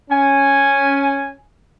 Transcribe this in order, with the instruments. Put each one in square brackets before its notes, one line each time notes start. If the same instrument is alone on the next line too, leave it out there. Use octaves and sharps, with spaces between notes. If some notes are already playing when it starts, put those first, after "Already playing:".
[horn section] C#4 G#5